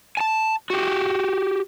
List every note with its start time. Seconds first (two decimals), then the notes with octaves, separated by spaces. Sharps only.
0.17 G#5 A5
0.70 F#4 G4